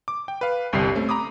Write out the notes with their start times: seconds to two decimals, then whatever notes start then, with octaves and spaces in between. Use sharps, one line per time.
0.08 D6
0.28 G5
0.41 B4 F5
0.73 G1 C2 G3 G4 C7
0.95 A3 C4 C#4
1.09 A#5 B5 D6 D#6